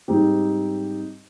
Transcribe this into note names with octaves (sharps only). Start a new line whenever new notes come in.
G#2 G3 C4 D#4 G4